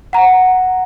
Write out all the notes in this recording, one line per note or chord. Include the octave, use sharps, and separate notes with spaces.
F#5 A#5